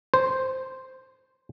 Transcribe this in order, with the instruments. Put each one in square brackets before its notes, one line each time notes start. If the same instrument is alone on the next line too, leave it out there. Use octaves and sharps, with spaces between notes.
[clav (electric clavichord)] C5